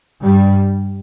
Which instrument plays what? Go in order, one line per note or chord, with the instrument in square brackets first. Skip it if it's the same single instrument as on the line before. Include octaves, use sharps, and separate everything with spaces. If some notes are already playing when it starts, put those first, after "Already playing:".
[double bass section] G2 G3